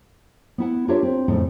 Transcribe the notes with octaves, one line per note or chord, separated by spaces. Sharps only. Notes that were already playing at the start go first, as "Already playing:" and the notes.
B3 E4 F#5
D4 F4 G4 A#4 C#5 E5
C4
F2 A2 C#3 A3 D#4